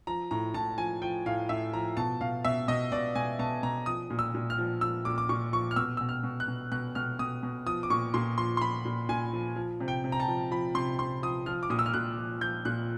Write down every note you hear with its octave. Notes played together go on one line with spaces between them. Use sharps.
F3 A#5
A2 A#5
A2 A5
F3 G#5
F3 G5
A2 F5
A2 E5
F3 A#5
B2 A5
B2 F5
B2 E5
B2 D#5
B2 D5
B2 G#5
B2 A5
B2 A#5
F3 D#6
A#2
E6
A#2
F6
F3
F3 E6
A#2 D6
D6
A#2 C#6
F3 C#6
F6
B2 E6
B2 E6
F6
B2
F#6
B2
B2 F#6
B2 F6
B2 D#6
B2
F3 D#6
D6
A#2 C#6
A#2 C6
F3 C6
C6
F3 B5
A#2
A#2 G#5
F3
F3
C3
G5
C3
A#5
A5
F3
F3 B5
C3 C6
C3 C6
F3 D#6
F3 F6
D6
A#2 D#6
E6
F6
A#2 F#6
F3
F3 G6
A#2 F#6